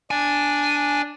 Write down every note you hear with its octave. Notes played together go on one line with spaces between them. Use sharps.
D4 G#5